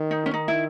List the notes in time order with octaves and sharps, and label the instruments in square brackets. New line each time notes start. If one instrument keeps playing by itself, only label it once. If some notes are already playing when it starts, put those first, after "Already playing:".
Already playing: [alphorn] D#3
[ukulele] D#4
C#4
[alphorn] D#3 [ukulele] D#4
[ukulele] E4